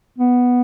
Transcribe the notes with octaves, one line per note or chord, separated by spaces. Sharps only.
B3